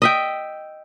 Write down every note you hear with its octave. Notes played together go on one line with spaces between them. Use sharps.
D#5 E5 G5